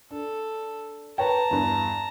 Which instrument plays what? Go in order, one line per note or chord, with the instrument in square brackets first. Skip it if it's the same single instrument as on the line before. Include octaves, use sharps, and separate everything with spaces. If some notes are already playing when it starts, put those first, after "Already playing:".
[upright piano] D4 [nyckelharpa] A4
[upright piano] B4 C#5 G5 [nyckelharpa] A5 A#5
[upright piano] E2 G2